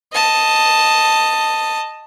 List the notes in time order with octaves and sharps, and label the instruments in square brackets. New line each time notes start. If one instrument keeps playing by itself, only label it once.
[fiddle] D#5 A5